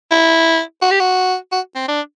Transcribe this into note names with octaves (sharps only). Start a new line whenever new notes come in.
E4
F#4
G4
F#4
F#4
C4
D4